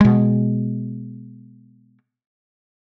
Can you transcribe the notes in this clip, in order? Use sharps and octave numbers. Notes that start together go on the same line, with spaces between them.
B2 G#3